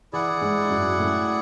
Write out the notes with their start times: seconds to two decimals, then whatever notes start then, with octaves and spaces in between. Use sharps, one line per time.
0.13 E3 E4 G#4 D5 F#5
0.41 G#2 G#3
0.70 F#2 F#3
0.98 A2 A3